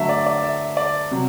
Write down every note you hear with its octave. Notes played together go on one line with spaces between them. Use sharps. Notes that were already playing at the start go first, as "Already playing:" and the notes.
Already playing: D3 F#3 A3 E5
D5
D5
E5
D5
C3 F#3